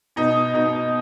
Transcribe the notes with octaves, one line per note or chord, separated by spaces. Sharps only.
B2 D#4
B2 D#4